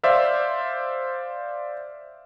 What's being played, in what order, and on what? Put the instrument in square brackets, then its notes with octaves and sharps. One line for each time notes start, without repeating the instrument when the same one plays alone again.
[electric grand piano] C5 D5 E5 F5